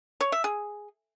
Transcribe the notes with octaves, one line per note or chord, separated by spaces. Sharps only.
C#5
E5
G#4